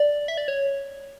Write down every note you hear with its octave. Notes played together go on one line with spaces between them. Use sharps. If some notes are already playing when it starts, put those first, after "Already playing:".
Already playing: D5
E5
D5
C#5